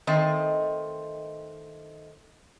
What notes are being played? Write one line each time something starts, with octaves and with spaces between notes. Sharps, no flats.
D#3 A3 C4 D#5